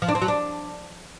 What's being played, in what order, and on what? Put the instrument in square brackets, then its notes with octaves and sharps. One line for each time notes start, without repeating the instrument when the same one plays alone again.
[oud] F3
D4
C4
F#3
D4